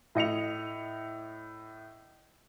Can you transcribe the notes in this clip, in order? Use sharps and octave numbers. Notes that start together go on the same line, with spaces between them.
A2 D#5 C#7 F7